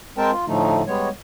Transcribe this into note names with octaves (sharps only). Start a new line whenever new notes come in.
G#3 C4 A#4 C5 G5 A5
F4
A2 D3 F3 A3 D#4
G3 G#3 B3 C#5